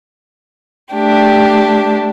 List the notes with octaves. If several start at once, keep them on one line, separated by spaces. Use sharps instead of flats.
A3 D4 G4